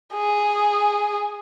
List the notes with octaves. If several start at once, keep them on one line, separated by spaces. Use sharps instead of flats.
G#4